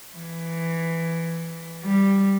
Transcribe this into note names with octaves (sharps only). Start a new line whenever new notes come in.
E3
G3